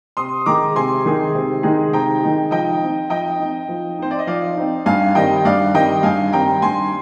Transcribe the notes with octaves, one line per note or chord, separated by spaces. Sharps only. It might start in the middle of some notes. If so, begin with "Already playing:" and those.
C3 C6 D#6
D#3 G#3 D#4 G#4 A#5 D6
C3 G#5 C6
D#3 G#3 D#4 G#4
C3
D#3 G#3 D#4 G#4
C3 G5 A#5
D#3 G#3 D#4 G#4
F3 D#5 G5
C4 D#4
F3 D#5 G5
C4 D#4
F3
C4 D#4 C5
D5
D#5
F3 D5 F5
C4 D#4
G2 F5 G#5
D#3 G3 C4 D#5 G5
G2 D5 F5
D#3 G3 C4 D#5 G5
G2 F5 G#5
D#3 G3 C4 G5 A#5
G2 G#5 C6